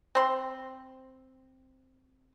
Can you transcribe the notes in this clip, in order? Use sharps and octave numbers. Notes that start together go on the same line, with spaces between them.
C4 C6